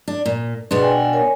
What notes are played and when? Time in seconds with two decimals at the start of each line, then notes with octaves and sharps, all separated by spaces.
0.08 D4
0.26 A#2
0.71 B2 D4 G#4 B4 C6
0.82 G5 G#5
1.13 A#4 C#5 G#5